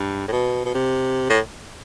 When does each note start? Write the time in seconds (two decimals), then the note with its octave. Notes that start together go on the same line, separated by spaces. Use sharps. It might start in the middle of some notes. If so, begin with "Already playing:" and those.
Already playing: G2
0.28 A2
0.32 B2
0.65 B2
0.74 C3
1.29 A2